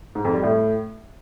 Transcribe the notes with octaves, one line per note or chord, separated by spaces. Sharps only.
G#2
F2
G3
A2